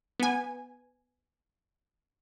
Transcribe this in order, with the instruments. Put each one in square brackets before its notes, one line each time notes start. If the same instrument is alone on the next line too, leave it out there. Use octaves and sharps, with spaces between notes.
[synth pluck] B3 G#5